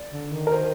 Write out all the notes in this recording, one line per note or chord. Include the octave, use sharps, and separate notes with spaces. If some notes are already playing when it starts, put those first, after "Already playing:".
Already playing: D5
D3
D#3
A#4
C5